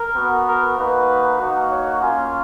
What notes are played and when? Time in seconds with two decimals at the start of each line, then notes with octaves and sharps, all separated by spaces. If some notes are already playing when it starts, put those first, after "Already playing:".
Already playing: A#4
0.16 B3 F#4
0.46 A#4
0.78 A#3 D#4 F#4 B4
1.39 A#3 D#4 F#4
1.70 C#5
2.01 A#3 C#4 F4 G#5